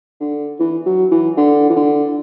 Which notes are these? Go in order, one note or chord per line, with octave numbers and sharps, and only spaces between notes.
D3
E3
F#3
E3
D3
E3
D3